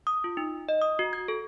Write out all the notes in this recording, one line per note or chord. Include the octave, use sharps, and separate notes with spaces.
D#6
F4
D#4
D#5
D#6
F#4
G#6
A4